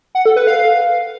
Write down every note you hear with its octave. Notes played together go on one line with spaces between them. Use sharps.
F#5
A4
B4
F5